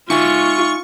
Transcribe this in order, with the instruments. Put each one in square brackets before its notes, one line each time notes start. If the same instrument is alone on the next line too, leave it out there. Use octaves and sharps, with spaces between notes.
[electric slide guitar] D#4 E5 G#5 [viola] F4 [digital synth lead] C#6